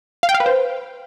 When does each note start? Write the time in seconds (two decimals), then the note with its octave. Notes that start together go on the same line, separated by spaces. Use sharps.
0.23 F5
0.29 G5
0.34 F5
0.40 B4
0.46 C5